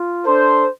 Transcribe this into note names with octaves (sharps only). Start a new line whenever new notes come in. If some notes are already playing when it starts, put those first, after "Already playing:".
Already playing: F4
D4 A4 C5